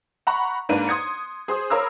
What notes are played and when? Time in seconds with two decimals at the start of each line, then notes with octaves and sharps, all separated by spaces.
0.27 F#5 A#5 B5 C#6
0.69 G#2 A#3 D4 B4 D#7
0.88 C6 D#6 G#6 C#7
1.48 G#4 C5 D#6
1.70 A#4 C#5 F5 B5 D#6 E6